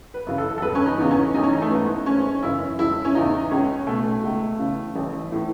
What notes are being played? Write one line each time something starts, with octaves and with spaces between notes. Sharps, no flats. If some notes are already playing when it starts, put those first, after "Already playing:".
B4
F#2 C#3 E3
A4
A4
E1 B4
C#4
D#4
E2 C#3 E3 B3
C#4
A1 D#4
C#4
D#4
A3
G#2 E3 B3
F#1 C#4
F#2 C#3 E3 E4
E1 E4
C#4
E2 C#3 D#4
C#2 C#4
B2 A3
C#2
C#3 E3
A1
A2 E3